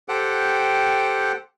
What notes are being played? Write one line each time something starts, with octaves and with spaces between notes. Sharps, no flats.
G4 A4 C5 F#5 G5